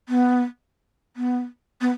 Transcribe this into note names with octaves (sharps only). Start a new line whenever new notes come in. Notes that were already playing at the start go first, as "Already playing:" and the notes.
B3
B3
B3